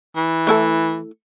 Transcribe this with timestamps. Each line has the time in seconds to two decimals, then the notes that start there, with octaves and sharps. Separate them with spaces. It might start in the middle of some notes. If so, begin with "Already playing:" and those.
0.16 E3
0.47 A3 E4 A4